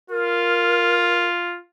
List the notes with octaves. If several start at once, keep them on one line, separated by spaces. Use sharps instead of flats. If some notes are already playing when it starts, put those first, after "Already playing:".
F4 A#4